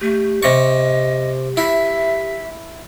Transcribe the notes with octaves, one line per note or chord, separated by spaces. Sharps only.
A3 G4
C3 D#5 C#6
E4 E5